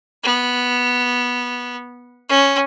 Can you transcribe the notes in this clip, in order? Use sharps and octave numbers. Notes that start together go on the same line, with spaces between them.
B3
C#4